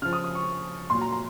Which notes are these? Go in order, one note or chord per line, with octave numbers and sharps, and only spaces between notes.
C#3 F3 F6
D#6
D#6
C#6
A#2 F#3 C6
A#5
A#5